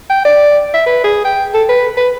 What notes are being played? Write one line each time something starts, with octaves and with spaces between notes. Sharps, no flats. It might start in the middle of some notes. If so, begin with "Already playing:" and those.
G5
D5
E5
B4
G#4
G5
A4
B4
B4